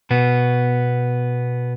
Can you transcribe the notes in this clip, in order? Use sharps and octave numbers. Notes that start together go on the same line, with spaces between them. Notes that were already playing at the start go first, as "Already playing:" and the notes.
B2 B3